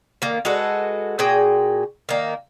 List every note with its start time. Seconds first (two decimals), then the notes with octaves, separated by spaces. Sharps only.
0.22 D#3 A#3
0.45 G#3 F#4 A4 B4
1.19 A#2 F#4 G#4 G5
2.09 D#3 A#3